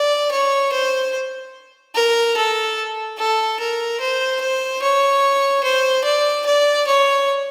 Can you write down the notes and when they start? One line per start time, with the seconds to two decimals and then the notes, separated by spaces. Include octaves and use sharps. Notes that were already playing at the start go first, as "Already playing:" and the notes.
Already playing: D5
0.31 C#5
0.72 C5
1.95 A#4
2.37 A4
3.18 A4
3.59 A#4
4.00 C5
4.41 C5
4.82 C#5
5.63 C5
6.04 D5
6.46 D5
6.87 C#5